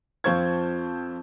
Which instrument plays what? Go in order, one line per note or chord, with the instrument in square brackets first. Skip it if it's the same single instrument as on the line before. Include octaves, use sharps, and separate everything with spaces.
[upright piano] F2 C4 F4 C5 C#6 G#6